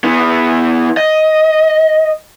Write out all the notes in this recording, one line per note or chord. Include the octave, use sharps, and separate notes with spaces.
E3 B3
D#5